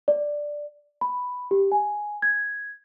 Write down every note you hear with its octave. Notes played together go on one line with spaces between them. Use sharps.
D5
B5
G4
G#5
G#6